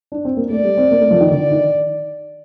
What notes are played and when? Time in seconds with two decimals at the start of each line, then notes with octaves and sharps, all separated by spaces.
0.12 D4
0.25 C4
0.37 A#3
0.50 A3 D5
0.64 G3
0.77 C4
0.91 A#3
1.00 A3
1.11 F3
1.20 D#3
1.31 D3 D5
1.51 D#3